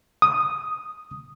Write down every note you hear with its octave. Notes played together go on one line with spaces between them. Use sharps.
D#6